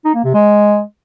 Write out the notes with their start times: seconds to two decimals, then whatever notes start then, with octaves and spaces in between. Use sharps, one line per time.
0.05 D#4
0.15 A#3
0.24 C3
0.34 G#3